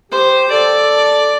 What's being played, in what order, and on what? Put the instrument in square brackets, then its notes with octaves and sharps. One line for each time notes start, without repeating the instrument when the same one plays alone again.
[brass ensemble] G4 [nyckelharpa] C5
[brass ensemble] A4 [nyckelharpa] D5